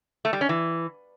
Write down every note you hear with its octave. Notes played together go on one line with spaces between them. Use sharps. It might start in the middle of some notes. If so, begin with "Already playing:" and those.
A3
G3
C#4
E3